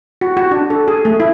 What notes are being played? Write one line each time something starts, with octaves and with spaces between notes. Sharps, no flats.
F#4
F#4
D4
A4
G#4
A3
E4